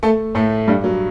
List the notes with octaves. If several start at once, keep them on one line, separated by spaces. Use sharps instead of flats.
A3 A4
A2 A3
G2 G3
F#3